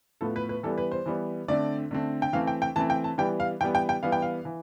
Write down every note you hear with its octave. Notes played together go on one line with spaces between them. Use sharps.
A2 F3 B3 A4
B4
B4
E3 G3 B3 A4
B4
C5
E3 G3 B3
D3 A3 C4 D5
D3 A3 C4
G5
E3 A3 C4 F5
G5
G5
E3 A3 C4 A5
G5
A5
E3 G3 B3 G5
F5
E3 G3 B3 G5
G5
G5
E3 G3 B3 F5
G5
F5
E3